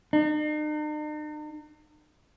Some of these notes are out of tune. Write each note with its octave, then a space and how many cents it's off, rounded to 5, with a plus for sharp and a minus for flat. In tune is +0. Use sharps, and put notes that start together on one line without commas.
D#4 -45